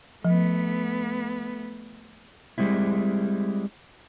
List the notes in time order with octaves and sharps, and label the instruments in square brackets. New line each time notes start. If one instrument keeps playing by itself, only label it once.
[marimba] F3 [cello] A3 B3
[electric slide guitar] G3 G#3 C4 E4